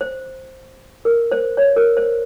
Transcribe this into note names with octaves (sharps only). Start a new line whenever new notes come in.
C5
A#4
C5
C#5
A#4
C5